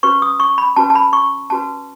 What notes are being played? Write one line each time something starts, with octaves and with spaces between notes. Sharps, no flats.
C#4 F#4 B4 C#6
D#6
C#6
B5
C#4 F#4 B4 A5
A5
B5
C#6
C#4 F#4 B4 A5